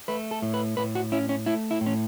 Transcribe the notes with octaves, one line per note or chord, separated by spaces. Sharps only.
A3 B4
A4
A2
B4
A2 B4
F#4
C#4 E4
C#4
A3 E4
E4
A2
C#4